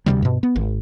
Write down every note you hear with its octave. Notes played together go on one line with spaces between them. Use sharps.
D2 C3 E3 G3
G2 B2
B3
G#1